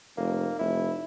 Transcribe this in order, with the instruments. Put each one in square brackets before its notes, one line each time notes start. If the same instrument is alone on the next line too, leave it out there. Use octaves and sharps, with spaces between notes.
[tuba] F1 [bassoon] A#3
[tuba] F1 [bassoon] E4